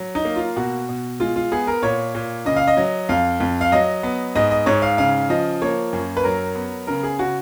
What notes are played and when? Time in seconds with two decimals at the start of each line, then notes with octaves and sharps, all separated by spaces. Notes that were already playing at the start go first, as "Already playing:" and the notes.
Already playing: F#3
0.15 D#4
0.25 A#3
0.36 F4
0.56 B2 F#4
0.89 B2
1.20 G#3 F4
1.36 F4
1.52 B3 G#4
1.67 A#4
1.83 A#2 C#5
2.15 A#2
2.45 C#3 D#5
2.56 F5
2.68 D#5
2.77 F#3
3.09 F2 F5
3.40 F2
3.61 F5
3.72 F#3 D#5
4.03 B3
4.35 G#2 D#5
4.51 D#5
4.66 G#2 C#5
4.82 F5
4.98 C#3 F5
5.29 F3 D#5
5.62 A#3 C#5
5.93 F#2
6.17 B4
6.24 F#3 A#4
6.55 B3
6.87 C#3 A#4
7.03 G#4
7.19 C#3 F#4